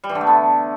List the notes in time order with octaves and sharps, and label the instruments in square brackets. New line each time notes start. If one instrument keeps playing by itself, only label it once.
[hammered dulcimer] G3
E3
D3
A3
B3